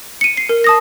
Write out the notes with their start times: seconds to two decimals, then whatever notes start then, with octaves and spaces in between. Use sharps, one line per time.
0.21 C#7 D#7
0.37 C7
0.49 A#4
0.64 A5 D#6 A#6